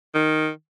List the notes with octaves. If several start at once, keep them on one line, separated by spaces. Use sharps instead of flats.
D#3